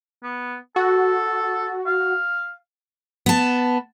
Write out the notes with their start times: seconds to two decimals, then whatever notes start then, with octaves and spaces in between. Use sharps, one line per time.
0.23 B3
0.76 F#4 A4
1.87 F5
3.26 B3 A5